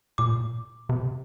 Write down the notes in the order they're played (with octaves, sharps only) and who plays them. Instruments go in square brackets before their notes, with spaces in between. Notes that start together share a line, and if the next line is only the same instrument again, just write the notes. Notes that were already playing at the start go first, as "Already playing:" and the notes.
[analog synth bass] A#2 [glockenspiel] D6
[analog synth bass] C3